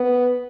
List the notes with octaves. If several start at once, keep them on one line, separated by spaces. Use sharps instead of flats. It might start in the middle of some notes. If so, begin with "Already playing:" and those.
Already playing: B3